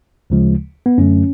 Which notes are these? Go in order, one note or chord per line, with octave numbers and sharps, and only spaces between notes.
D2 C#3 F3 G#3
B3
F#2 D3 F#3 A3 C#4